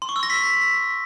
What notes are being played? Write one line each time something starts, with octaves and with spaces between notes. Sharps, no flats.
C6
C#6
E6
A#6
B6